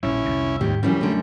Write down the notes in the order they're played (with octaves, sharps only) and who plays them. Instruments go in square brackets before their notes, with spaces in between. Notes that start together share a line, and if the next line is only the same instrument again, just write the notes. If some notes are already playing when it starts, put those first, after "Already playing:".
[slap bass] A#1 A#2 G3 [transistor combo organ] C#4 E4
[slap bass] C2 F2 D3
[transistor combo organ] D#2 [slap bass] G#2 G3 G#3 [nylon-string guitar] G4
[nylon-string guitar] F#2 E3 C#4 [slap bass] F3 [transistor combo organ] G3
[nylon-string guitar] F#2 D3 [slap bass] A3